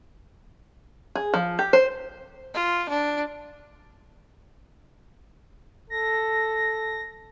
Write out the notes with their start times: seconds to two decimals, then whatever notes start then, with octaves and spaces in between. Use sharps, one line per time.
1.15 G#4
1.34 F3
1.59 G4
1.73 C5
2.54 F4
2.89 D4
5.90 A4 A#6